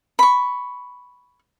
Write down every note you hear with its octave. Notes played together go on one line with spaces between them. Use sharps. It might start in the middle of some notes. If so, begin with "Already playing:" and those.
B5 C#6